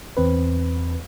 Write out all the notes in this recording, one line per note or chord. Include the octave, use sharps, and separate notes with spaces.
E2 C4 B4